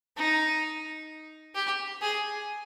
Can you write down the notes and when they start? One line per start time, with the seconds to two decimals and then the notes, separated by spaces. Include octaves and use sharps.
0.17 D#4
1.55 G4
2.02 G#4